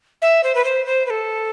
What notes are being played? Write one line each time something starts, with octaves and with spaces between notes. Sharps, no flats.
E5
C5
B4
C5
C5
B4
A4